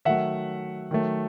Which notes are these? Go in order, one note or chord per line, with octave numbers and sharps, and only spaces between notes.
D#3 F#3 A3 E5 F#5
D#3 F#3 A3